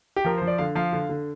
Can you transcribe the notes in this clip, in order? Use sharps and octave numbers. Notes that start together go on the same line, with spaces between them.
G4
F3 A#4
F3 C5
D5
D3 F5
F3 F5
D3
D3